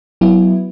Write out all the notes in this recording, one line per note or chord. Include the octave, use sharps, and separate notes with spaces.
F#3 B3 E4